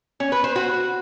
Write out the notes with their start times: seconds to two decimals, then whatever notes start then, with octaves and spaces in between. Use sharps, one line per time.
0.20 C#4
0.32 B4
0.44 C5
0.56 F#4